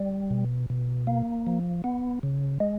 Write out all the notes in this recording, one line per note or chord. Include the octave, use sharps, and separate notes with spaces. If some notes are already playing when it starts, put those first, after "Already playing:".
Already playing: G3
B2
B2
A#3
F3
B3
C#3
G#3